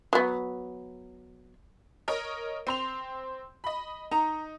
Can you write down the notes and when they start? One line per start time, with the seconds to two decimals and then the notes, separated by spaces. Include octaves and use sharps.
0.13 F#3 B3
2.08 A#4 C#5 D#5
2.67 C4 C6 F7
3.64 D#5 B5
4.11 D#4 A#5